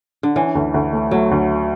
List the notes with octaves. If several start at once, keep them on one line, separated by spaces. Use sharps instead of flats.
D3
E3 C#4
D2
D2
A3
F#3 A3
D2